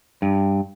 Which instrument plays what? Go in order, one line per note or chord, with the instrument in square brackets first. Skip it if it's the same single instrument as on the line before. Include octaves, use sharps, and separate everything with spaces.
[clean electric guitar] G2